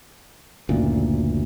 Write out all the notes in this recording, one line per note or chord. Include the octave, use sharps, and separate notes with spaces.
F#1 D2 A#2